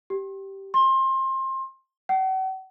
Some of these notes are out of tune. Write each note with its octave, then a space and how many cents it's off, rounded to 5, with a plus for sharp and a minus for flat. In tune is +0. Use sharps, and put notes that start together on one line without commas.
G4 -10
C6 +25
F#5 +40